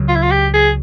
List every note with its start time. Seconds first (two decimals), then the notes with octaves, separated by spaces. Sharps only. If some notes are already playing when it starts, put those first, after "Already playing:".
Already playing: C#2 C#3 F#3
0.08 F4
0.15 E4
0.22 F4
0.31 G4
0.54 G#4